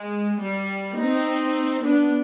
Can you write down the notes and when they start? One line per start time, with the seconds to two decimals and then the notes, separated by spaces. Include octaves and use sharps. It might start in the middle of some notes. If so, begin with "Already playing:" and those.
Already playing: G#3
0.41 G3
0.97 C4 D#4
1.84 B3 D4